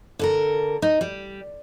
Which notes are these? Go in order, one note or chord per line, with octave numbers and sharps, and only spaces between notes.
D3 A4 A#4
D#4
G3